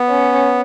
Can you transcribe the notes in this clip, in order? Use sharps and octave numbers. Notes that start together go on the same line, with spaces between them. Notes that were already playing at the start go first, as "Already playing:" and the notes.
Already playing: B3
C#4